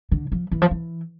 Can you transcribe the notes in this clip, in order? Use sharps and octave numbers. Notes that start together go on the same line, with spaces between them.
D3
F3
E3
F3
E3